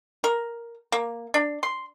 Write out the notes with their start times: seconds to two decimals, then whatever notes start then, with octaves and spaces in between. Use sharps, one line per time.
0.24 A#4
0.92 A#3
1.34 D4
1.63 C6